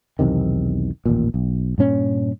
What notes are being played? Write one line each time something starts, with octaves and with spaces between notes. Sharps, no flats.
B1 E2 C3 D#3
A1 D#2 A#2
B1
G2 A#2 C#4